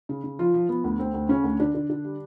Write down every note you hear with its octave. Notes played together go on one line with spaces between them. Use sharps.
C#3
C#3
F3 F4
F3
F3 B3
D2
D2 C4
D2
C#3 C#4
D2
D3 D4
D3
D3
G3